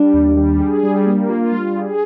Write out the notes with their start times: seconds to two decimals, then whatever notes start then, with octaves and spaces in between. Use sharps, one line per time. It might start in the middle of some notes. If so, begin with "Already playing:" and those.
Already playing: G3 D4
0.14 D#2
0.37 G3
0.60 G#4
0.83 G3
1.06 A#3
1.29 F4
1.52 G3
1.75 G#4